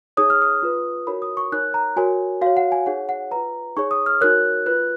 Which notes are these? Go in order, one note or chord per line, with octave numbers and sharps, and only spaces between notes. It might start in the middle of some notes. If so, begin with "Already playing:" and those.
D#4 G#4 C#5 D#6
F6
D#6
F4 B4
D#4 F#4 A#4 C#5 B5
D#6
C#6
D#4 A#4 C#5 F#6
A#5
F#4 A#4 C#5 G#5
F#4 C#5 F5
F#5
G#5
D#4 G#4 C#5 F#5
F#5
F4 B4 A#5
D#4 G#4 C#5 C#6
D#6
F6
D#4 F#4 A#4 C#5 F#6
F4 B4 F#6